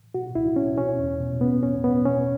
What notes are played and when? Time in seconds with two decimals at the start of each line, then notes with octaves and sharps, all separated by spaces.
0.14 B2 F#4
0.35 C#2 E4
0.56 B2 C#4
0.77 B2 C#4
0.99 E2
1.20 B2
1.41 B2 B3
1.63 E2 C#4
1.84 B2 B3
2.05 B2 C#4